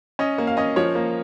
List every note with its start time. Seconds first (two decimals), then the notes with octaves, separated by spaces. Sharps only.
0.19 C#4 D#5
0.38 A#3
0.47 F5
0.57 C#4 D#5
0.76 F3 C#5
0.95 A#3